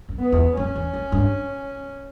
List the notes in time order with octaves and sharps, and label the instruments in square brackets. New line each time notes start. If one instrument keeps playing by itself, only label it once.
[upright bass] F#2
[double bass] B3
[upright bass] E2
[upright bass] F#2 [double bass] C#4
[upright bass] E2
F#2
G2